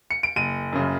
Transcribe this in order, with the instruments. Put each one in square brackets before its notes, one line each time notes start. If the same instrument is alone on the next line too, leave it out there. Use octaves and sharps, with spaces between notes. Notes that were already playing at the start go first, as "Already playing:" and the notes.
[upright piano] C#7
D7
F#1 D#7
F#2 C#3